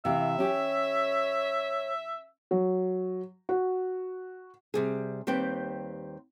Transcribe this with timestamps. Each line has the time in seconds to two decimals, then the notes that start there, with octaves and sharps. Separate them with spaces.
0.05 C3 E3 E5 F5
0.38 C#4 G4 C#5
2.51 F#3
3.49 F#4
4.74 C3 G3 G#4
5.27 D#2 G3 C4 B4 G5